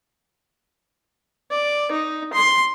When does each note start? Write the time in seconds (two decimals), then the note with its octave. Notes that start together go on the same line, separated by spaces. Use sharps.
1.51 D5
1.91 D#4
2.33 C6